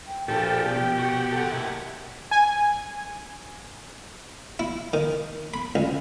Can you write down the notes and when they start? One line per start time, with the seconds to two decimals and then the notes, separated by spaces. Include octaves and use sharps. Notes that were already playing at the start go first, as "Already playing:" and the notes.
0.07 G5
0.28 A#2 F3 G4 A4 G5
0.66 B2 G4
0.99 F#4
1.33 A4 F#5
1.52 A#3 D#4 E4
2.31 G#5
4.59 E4
4.93 D#3
5.54 B5
5.75 C#2